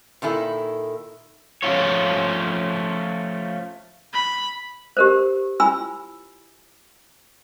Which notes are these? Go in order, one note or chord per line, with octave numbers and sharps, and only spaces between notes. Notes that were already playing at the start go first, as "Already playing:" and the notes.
A#2 D#3 E4 A4
F3 A3 C#4 F4 C#5
B5
G4 A#4 C5
E4 F4 G#5 B5 E6